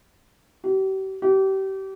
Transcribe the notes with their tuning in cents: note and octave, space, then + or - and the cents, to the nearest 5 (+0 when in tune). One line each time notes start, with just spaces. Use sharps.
G4 -40
G4 -30